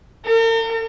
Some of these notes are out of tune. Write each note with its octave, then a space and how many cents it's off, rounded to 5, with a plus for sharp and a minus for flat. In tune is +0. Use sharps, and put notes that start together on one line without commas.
A#4 -45